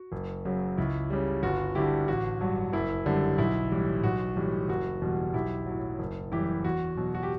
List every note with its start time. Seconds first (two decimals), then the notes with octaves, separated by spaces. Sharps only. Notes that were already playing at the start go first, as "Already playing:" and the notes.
Already playing: F#4
0.12 F#1
0.45 F#2 C#3 F#3
0.77 C#2 E4
1.10 C#3 G3
1.43 G1 F#4
1.75 G2 D3 G3 E4 G4
2.08 A1 F#4
2.41 G2 F#3
2.73 F#1 E4
3.06 F#2 D3 G3
3.38 B1 E4
3.72 A2 E3 G3
4.03 B1 F#4
4.36 A2 E3 G3
4.69 F#1 F#4
5.02 E2 B2 G3
5.34 B1 E4 G4
5.66 A2 F#3
5.99 F#1
6.32 F#2 E3 G3 E4 G4
6.64 E2 F#4
6.97 B2 F#3
7.14 F#4
7.23 G4